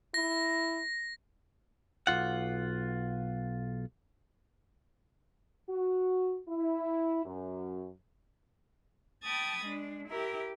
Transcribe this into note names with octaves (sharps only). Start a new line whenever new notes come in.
E4 A#6
B1 G#2 F4 F#5
F#4
E4
F#2
G5 A5 B5 D#6 G#6 A6
G#3 D4
E4 G4 A#4